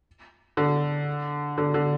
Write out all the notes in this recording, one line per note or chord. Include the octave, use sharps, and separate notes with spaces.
D3
D3
D3